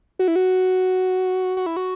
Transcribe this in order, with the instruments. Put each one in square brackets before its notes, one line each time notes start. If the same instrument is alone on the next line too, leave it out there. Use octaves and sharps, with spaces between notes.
[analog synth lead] F#4
E4
F#4
F#4
E4
F#4